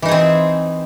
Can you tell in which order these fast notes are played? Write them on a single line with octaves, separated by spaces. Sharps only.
E3 D#4 G#4 C4